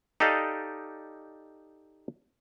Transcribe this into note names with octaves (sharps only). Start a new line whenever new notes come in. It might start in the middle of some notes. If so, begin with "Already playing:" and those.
D#4 G4 A4 D5 D#5 F5